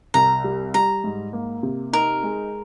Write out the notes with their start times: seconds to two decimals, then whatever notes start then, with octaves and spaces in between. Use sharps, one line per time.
0.14 C2 A#5
0.44 G3
0.74 G3 A#5
1.04 G#2
1.33 A#3
1.63 C3
1.93 D#4 A#4
2.23 G#3